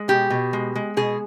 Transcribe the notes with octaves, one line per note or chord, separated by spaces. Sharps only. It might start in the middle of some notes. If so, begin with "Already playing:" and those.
Already playing: G#3
B2 G4
B2
G#3
G#3
B2 G#4